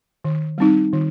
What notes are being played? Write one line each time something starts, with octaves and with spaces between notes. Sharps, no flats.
D#3
G3 C4 D#4
D#3